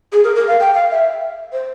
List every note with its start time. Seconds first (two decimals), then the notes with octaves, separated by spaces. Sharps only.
0.13 G#4
0.24 A#4
0.36 A#4
0.48 F5
0.60 G5
0.75 F5
0.91 E5
1.52 C5